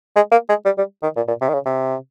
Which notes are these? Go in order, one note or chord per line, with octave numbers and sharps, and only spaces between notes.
G#3
A#3
G#3
G3
G3
D#3
A#2
A#2
C3
D#3
C#3
C3